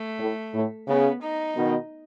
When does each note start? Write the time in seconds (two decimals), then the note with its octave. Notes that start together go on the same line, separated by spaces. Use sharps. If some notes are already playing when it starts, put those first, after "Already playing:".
Already playing: A3
0.19 A2
0.54 A2
0.88 C#3 B3
1.22 D#4
1.55 B2 D#3